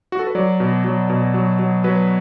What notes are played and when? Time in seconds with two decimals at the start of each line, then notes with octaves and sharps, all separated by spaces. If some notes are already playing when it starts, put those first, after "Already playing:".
0.12 F#4
0.19 A4
0.27 B4
0.35 F#3 D5
0.60 B2
0.84 F#3
1.10 B2
1.34 F#3
1.59 F#3
1.84 F#3 B4